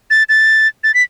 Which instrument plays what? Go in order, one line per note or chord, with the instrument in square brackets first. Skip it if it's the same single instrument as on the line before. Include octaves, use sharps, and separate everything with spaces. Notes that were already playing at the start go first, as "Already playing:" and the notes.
[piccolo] A6
A6
A6
B6